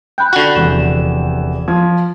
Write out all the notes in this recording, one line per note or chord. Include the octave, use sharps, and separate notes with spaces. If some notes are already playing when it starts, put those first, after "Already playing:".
G5 B5 F#6 G6
D3 F#4
F1 E2 E7
F3 G#6